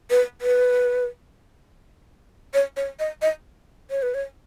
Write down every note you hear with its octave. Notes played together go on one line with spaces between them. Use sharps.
B4
B4
C#5
C#5
D#5
D#5
C#5
B4
C#5